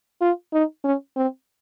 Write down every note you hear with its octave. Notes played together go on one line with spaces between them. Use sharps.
F4
D#4
C#4
C4